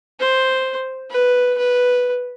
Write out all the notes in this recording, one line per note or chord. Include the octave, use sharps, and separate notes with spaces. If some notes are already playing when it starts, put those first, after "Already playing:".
C5
B4
B4